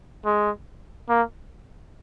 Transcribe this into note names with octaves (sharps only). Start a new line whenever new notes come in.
G#3
A#3